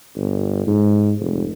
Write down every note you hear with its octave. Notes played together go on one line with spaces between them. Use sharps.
G1
G#2
F1